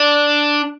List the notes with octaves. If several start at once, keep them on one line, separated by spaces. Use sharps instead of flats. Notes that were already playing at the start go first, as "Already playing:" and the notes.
Already playing: D4